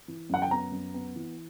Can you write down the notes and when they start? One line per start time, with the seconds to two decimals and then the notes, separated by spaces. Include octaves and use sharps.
0.08 E3
0.30 F#2 F#5
0.42 G5
0.51 B3 A#5
0.72 F#2
0.94 B3
1.16 E3